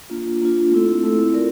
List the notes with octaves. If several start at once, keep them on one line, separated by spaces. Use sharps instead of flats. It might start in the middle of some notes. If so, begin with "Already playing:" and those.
A#3 D4 F4
A#3 D4 F4
A3 C4 E4 A4
A3 C4 E4 A4
F4 A#4 D5